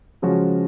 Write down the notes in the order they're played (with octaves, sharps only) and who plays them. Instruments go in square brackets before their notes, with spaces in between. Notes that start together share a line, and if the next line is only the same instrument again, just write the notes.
[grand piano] C#3 F3 G#3 C#4 F#4